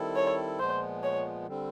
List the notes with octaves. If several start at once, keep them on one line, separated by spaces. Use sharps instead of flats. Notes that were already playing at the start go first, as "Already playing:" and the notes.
Already playing: D#3 G3 C4 E4 A4
C#5
A#2 F3 G#3 B3 C5
C#5
D3 G3 C4